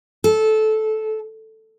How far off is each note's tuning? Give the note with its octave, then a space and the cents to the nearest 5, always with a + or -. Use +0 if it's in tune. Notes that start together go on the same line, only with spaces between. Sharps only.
A4 -15